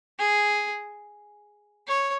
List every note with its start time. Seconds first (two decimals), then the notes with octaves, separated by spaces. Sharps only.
0.19 G#4
1.87 C#5